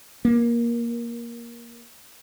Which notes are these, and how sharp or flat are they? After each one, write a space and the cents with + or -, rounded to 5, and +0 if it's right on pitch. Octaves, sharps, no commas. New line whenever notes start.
A#3 +15